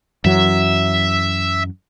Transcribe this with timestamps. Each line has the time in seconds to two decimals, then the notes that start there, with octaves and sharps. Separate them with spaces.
0.25 F#2 E3 F#3 E5